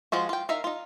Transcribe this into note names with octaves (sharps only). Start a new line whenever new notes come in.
F3 G#3 F4 F#4
F4 G5
D#4 A#4 E5 F5
D#4 F4